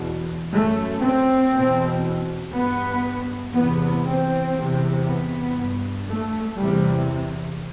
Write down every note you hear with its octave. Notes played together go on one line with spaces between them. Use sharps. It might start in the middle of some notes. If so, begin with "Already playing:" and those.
Already playing: E2 B2
F#2 A3
C4
E2 B2
G2 B3
E2 C3 B3
C4
E2 C3
B3
G2
A3
E2 C3 G3